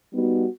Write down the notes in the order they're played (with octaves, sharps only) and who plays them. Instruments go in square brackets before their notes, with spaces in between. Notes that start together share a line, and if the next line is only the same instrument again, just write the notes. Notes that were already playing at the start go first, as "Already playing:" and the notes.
[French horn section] G3 B3 D#4 F#4